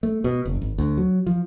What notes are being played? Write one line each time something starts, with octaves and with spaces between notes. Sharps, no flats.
A3
B2
F#1
G#1
D2
F#3
F3